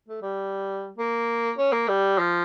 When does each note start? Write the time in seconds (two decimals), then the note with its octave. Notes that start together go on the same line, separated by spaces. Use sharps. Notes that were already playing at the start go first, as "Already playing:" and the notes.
0.08 A3
0.22 G3
0.98 A#3
1.58 C#4
1.72 A#3
1.88 G3
2.18 F3